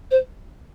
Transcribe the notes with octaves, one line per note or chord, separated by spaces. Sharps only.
C5